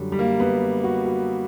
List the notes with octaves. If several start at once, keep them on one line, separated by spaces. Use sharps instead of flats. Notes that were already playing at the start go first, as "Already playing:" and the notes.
Already playing: F#2 D3 F#3 G3
G3
A#3
B3
F#4
F#4